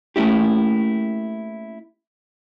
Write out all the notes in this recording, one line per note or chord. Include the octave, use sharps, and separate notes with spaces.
A3 A#3 C#4 E4 G4